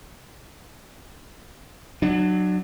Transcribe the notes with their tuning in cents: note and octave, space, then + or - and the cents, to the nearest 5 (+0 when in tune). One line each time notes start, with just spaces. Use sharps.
F#3 +0 D4 +35